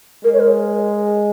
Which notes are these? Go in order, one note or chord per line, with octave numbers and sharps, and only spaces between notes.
G#3 A#4
C#5
A#4